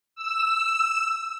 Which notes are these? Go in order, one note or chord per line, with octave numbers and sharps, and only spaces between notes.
E6